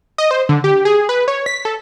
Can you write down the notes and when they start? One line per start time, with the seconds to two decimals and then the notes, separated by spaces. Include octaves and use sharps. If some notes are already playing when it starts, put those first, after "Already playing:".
0.18 D#5
0.31 C5
0.49 D3
0.64 G4
0.85 G#4
1.09 B4
1.28 C#5
1.46 B6
1.65 A4